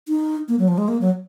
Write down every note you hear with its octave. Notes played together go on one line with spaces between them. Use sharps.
D#4
A#3
F#3
F3
G#3
A#3
F#3